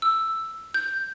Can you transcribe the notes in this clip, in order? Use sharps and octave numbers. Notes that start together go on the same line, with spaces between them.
E6
G6